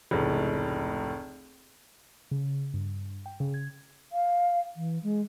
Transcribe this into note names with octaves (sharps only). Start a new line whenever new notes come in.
F1 C#2 A2
C#3
G2
G5
C#3
G#6
F5
E3
G#3